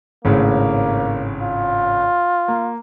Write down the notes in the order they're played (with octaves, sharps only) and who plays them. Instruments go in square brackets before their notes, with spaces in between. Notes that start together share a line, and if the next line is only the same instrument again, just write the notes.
[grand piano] G#1 A2 C#3 [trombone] A#3
[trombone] F4
[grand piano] A#3